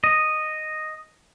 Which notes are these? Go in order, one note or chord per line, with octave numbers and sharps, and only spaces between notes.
D#5